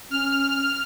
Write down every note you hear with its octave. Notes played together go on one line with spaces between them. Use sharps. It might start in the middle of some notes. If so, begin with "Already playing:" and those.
C#4 F6